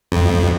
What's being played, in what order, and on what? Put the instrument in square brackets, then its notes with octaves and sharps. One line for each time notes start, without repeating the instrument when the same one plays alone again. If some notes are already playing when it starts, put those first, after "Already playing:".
[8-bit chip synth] F2